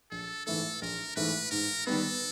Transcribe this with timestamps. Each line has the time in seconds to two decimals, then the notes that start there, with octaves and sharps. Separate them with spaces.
0.11 A#1 A4
0.46 G#2 E3 A3 A4
0.82 A#1 A#4
1.16 G#2 E3 A3 B4
1.51 G#2 A#4
1.86 D#3 G3 B3 A4